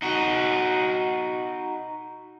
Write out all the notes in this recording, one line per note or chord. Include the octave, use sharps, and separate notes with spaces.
D#4 F#4